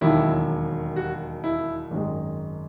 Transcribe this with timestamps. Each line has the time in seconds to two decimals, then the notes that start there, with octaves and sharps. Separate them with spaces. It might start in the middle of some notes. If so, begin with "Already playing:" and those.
0.01 E1 D#2 D#3 F#3 E4
0.96 F#4
1.44 E4
1.91 G#1 F#2 D#3 G#3